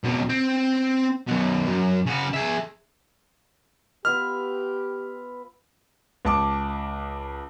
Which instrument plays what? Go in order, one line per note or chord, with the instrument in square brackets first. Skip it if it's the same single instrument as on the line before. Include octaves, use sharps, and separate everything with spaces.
[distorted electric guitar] C#2 B2
C4
F#2 B2
F#2
C#3 F#4
G#4 E5
[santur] B3 F4 E5 [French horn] G4 [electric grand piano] F6
[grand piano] C#2 A5 D6